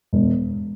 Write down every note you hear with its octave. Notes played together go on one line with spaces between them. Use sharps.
E1